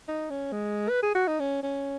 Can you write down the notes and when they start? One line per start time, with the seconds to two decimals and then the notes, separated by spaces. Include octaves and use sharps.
0.08 D#4
0.30 C#4
0.52 G#3
0.89 B4
1.03 G#4
1.15 F#4
1.27 D#4
1.40 C#4
1.63 C#4